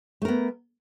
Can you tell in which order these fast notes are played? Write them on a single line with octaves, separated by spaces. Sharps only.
A3 A#4 B3